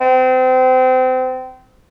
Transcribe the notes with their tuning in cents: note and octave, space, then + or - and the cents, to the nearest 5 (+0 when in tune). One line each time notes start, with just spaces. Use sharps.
C4 -30